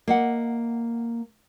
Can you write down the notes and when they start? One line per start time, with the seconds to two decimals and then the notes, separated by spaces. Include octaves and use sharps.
0.08 A#3 D#5 F#5